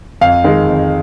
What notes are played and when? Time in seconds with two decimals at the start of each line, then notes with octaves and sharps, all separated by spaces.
0.21 F2 F5
0.44 D#3 G#3
0.67 F2